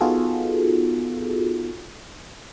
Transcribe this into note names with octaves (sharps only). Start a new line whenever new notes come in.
B3 D#4 F4 F#4 G#4 A4